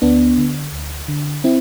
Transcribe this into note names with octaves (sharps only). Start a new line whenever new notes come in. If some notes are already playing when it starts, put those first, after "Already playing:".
D2 B3 D4
D3
D2
D3
C4 E4